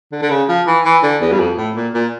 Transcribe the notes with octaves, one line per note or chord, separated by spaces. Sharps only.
D3
D3
C#3
F3
E3
E3
D3
E2
G2
F2
A2
A#2
A#2